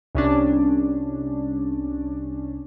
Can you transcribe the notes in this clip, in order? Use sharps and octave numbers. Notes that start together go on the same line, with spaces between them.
C2 C#4 D4